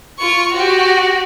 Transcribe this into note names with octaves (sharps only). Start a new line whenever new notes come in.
F4 C#6
F#4 G4